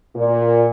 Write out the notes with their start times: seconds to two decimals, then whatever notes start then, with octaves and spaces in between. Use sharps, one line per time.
0.16 A#2